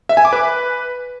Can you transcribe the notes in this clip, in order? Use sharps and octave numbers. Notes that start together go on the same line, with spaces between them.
E5
G#5
D6
B4